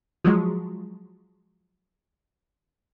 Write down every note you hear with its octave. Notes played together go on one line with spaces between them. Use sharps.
F3 F#3 G#3